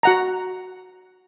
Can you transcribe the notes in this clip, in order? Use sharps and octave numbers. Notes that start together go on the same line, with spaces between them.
F#4 F#5 A#5